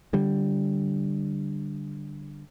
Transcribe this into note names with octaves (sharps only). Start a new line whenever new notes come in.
D3 G3